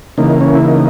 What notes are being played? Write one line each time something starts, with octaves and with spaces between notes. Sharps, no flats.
C#3 E3 A#3 D#4
C#4
E4
D#4